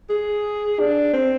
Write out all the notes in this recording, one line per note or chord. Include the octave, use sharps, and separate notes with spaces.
G#4
D4
C4